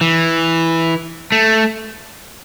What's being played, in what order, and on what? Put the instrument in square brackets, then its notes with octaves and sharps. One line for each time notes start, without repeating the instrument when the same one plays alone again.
[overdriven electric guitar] E3
A3